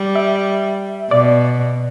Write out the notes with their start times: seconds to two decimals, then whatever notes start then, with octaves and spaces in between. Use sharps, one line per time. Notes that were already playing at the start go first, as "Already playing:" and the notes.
Already playing: G3
0.15 E5
1.11 B2 D5